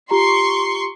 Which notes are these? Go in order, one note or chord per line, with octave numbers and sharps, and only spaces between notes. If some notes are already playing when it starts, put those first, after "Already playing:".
F4 G4 A#5 C6 C#6